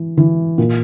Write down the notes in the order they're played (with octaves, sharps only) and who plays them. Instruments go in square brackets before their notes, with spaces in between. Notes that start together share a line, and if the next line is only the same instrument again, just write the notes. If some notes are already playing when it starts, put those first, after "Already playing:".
Already playing: [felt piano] E3
E3
A#2